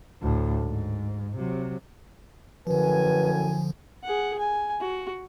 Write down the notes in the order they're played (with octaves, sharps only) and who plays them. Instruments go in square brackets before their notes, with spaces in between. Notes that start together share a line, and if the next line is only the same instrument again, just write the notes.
[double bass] D2 A2
G#2
C3 F#3
[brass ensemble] F#2 A2 G#5 [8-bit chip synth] D3 F3 [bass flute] B4
[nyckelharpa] G#4 F#5
G#5
F#4